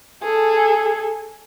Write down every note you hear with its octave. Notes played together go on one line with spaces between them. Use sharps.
G#4 A4